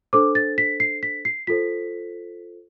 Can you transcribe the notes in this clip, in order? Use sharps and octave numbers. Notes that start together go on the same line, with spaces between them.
D4 A4 C5 D6
A6
B6
C7
B6
C7
F4 A4 C5 B6